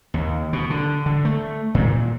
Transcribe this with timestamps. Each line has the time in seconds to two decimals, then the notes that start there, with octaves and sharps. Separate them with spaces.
0.14 D#2
0.53 B2
0.70 D3
1.06 D3
1.25 A3
1.75 A#2